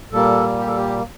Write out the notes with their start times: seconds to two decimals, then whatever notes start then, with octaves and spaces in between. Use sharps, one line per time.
0.11 A#2 G3 A#3 A4
0.58 G4
0.67 A4
0.77 G4